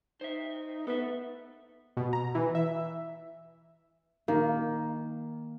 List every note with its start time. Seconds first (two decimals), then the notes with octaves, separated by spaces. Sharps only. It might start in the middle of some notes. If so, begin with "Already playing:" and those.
0.21 D#4 C5 E5
0.87 B3 A4 E5
1.97 B2
2.13 A#5
2.35 E3
2.55 E5
4.28 D#3 A#3